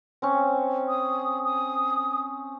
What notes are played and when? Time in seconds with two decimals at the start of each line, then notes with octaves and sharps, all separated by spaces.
0.22 C4 C#4
0.89 D#6
1.44 D#6